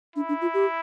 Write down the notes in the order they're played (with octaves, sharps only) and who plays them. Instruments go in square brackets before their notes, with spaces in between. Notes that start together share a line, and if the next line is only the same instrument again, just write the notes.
[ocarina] D4 [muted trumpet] E4
[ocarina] D4
F4
G4